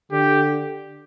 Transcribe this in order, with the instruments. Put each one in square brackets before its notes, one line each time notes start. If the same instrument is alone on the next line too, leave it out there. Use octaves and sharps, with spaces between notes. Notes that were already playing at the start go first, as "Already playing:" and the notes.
[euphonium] D3 [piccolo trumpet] G4